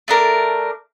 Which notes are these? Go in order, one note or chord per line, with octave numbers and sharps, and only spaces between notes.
A3 D4 A#4